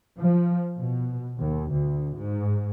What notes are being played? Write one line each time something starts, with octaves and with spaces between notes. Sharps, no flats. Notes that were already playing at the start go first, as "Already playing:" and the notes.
F3
B2
D#2
D2
G#2